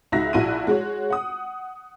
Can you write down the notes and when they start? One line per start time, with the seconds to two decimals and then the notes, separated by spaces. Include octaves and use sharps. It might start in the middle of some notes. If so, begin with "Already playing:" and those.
0.12 C#2 D#4 F#4 E5 A#6
0.33 A#1 E4 F#4 F#6 D#7
0.67 G#3 F#4 C#5
1.10 F#5 D#6